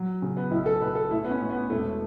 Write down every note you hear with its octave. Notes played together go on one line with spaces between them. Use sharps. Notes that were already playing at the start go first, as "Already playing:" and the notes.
Already playing: F#3
C#3
B3
B1 E4
A4
B1 B4
A4
A1 E4
B3
C#4
A1
B3
E1 A3